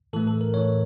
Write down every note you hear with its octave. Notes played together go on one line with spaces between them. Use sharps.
A2 E3 A3 A4
A4
A#4
A2 E3 A3 C#5